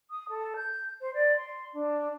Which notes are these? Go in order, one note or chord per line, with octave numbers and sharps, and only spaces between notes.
D#6
A4
G6
C5
D5
C6
D4